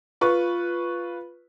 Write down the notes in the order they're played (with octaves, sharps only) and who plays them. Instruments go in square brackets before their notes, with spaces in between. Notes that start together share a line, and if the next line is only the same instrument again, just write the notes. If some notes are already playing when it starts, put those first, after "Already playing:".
[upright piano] F4 B4 C#6